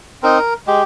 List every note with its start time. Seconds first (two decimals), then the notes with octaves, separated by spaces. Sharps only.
0.23 C4 D#4 A#4
0.67 G#3 G4